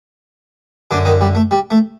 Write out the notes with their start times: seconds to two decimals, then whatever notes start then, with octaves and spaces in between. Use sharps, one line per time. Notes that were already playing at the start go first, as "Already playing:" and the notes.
0.91 F#2 D3 D4
1.05 D#3 D#4
1.21 G3
1.35 A3
1.51 G3
1.70 A3